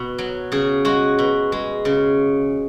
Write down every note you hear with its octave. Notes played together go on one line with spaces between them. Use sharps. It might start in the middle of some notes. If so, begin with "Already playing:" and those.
Already playing: B2
F#3
C#3 G#4
G#3 F#4
B2
G#3
C#3